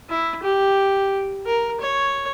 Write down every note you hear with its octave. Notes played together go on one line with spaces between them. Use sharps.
E4
G4
A#4
C#5